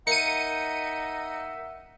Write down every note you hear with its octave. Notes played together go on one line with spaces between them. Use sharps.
A#3 D#4 E5 F#5 C#7 D#7